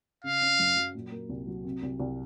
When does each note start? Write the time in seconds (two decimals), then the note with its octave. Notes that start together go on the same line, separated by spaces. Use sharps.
0.24 C#3 F5
0.42 C#4
0.59 F#2
0.77 F#3
0.95 A#2
1.12 A#3
1.30 C2
1.47 F#3
1.65 C3
1.83 C2
2.00 C2